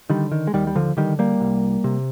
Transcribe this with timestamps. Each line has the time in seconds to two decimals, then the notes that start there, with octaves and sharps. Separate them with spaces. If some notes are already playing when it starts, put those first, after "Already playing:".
0.09 D3 D#3 G3
0.32 D#3
0.47 G#3
0.53 D#2 D#3 G3
0.67 G3
0.75 D3 F3
0.97 D3 D#3 G3
1.19 G3 A#3
1.41 C2
1.84 C3